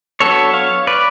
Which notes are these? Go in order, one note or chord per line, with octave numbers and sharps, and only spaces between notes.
F#3 B3 D4 A4 C#5
C#5 F5
B4 D5